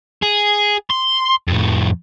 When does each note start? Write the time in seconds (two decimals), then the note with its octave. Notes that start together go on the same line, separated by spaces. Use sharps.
0.22 G#4
0.91 C6
1.48 F2 A2